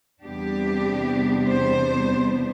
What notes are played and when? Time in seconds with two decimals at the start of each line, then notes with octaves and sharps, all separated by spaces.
0.23 E2 C3 G3 B3 D4 G4
1.49 C5